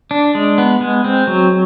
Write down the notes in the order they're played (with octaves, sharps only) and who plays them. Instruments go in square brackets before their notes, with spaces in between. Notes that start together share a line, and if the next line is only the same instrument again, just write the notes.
[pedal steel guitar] D4
G#3
B3
G#3
C4
F#3